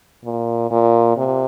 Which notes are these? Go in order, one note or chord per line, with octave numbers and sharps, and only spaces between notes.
A#2
A#2
C3